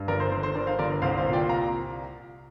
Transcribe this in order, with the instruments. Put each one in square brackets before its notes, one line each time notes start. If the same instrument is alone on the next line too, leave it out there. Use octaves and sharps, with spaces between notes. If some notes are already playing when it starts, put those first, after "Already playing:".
Already playing: [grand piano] G2
G1 A#4 D5
C5
D3 C5
C5
D3 A#4 D5
C5 F5
G1 A#4 D5
C2 C5 F5
C5 F5
A#2
D5 G5
C2 F5 A#5